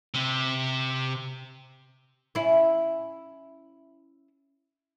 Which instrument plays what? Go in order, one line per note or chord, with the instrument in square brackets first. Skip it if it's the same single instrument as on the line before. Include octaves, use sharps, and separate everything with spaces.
[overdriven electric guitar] C3
[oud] C#4 E4